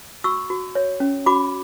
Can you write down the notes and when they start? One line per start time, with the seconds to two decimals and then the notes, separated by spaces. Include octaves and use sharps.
0.24 F#4 C#6 E6
0.50 F#4
0.75 C#5
1.00 C#4
1.26 F#4 B5 D6